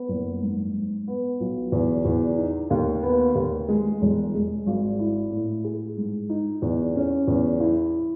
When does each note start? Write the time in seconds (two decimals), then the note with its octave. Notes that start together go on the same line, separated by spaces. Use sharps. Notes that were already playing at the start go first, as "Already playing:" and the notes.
Already playing: B3
0.08 F#1
0.42 G#2
0.74 G#2
1.08 B3
1.40 B1
1.72 E2
2.05 E2
2.38 D#4
2.70 D#2
3.03 B3
3.35 D#2
3.69 G#3
4.02 E1
4.34 G#3
4.66 G#1
4.99 E4
5.31 A2
5.64 G#4
5.97 G#2
6.29 D#4
6.62 E2
6.96 C#4
7.27 E2
7.60 E4